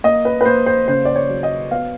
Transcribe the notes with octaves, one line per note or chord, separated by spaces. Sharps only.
A#3 D#5
B4
B4
A#3 C5
C5
C#3 C5
D5
C#5
F#3
D#5
B3 F5